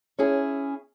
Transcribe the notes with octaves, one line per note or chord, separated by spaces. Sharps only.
C#4 E4 G#4